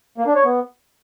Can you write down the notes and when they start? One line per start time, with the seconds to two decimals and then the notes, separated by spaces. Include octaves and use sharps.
0.18 A#3
0.27 D4
0.36 C#5
0.45 B3